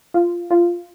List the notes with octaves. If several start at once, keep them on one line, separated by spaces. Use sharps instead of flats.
F4
F4